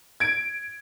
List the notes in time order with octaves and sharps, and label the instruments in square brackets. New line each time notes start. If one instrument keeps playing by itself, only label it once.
[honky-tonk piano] G#6 D7